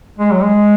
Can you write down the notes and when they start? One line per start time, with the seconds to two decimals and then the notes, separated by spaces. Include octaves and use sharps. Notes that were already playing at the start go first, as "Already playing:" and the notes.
0.19 G#3
0.31 F#3
0.42 G#3